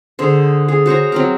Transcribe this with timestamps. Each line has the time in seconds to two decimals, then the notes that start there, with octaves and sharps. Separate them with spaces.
0.19 D3 G#4 C5
0.69 G#4
0.86 F#4 C5 C#5 A#5
1.12 F#3 C4 A#4